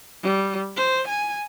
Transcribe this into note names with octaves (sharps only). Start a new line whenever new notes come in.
G3
C5
G#5